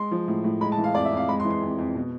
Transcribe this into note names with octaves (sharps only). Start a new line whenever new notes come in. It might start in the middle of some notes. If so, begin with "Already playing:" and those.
Already playing: G#3 C6
F3
A2
A2
G#3 B5
A5
E3
F5
F2 D5
E5
F2
F5
G#3 B5
C6
E3
C6
F2
F2
B2